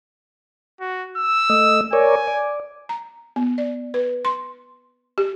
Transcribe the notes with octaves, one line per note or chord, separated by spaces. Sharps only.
F#4
E6
A3 D#5
A#4 C#5 D5 G#5
D5
A#5
B3
D5
B4
C6
G4